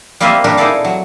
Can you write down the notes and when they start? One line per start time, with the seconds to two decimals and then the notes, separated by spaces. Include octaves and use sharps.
0.20 G3 A#3 C4 F4 D#5 E5
0.44 A#2 G3 D4 A#4
0.57 D#4 E4 G#4 A4 D5 F5
0.85 F#3